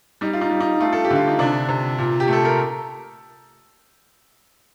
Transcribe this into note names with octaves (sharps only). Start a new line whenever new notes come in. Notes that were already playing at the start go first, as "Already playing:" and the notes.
G3 D#4
F4
D#4
G3
D#4
A3 F4
A4
G4
D3
F4
D#4
C3 D4
C3
A#2
G4
A3 A4
A#4